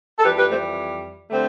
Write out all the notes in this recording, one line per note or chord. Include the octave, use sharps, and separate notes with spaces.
A4
F2 E3 G3 G4 B4
G4 B4
A3 C4
D3 G3 A3 C4